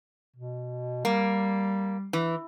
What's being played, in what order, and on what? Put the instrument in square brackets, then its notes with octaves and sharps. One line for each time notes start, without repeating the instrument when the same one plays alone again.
[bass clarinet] B2
[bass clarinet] G3 [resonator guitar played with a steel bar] A#3
[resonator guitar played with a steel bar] E3